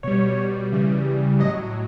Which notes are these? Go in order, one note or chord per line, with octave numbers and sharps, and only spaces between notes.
B2 G3 C#5
C#3 E3 G3
A2 F#3 D#5